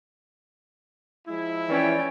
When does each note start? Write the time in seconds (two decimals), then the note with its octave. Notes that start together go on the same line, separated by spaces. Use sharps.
1.28 F3 G#3 E4
1.69 E3 C#4 D5 G5